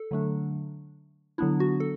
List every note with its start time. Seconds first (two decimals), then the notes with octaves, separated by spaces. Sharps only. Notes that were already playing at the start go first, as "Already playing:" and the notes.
Already playing: A4
0.11 D3 F#3 A3 D4
1.38 D3 F#3 B3 D4 E4
1.60 F#4
1.80 A4